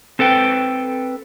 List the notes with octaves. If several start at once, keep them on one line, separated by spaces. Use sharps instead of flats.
C4 A4 B4 G5